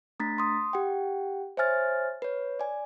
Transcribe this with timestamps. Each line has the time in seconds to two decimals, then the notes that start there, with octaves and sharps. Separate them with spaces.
0.20 A3 D4 A#5 A6 B6
0.38 C6 D#6
0.73 G4 F#5 G5
1.57 C5 C#5 E5 G#5 F6 A6
2.22 B4 C#5
2.60 D5 G#5